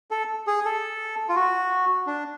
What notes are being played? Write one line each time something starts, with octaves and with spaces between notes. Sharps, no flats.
A4
G#4
A4
F4
F#4
D4